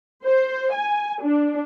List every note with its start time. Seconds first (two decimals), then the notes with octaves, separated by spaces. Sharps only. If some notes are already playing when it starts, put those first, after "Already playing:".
0.25 C5
0.73 G#5
1.22 D4